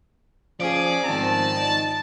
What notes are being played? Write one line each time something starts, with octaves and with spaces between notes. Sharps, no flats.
F3 C#4 G#4 D5
G#2 D#3 F3 C4 A5
D#4